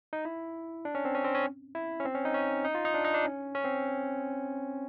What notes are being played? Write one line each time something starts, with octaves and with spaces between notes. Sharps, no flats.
D#4
E4
D4
C#4
C4
C#4
C4
C#4
E4
C#4
C4
C#4
D#4
C#4
D#4
F4
D#4
D4
D#4
D4
C#4
C#4
C4